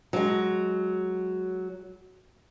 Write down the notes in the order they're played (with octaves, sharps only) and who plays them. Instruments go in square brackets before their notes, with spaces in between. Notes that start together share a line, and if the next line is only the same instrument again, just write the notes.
[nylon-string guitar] F#3 G#3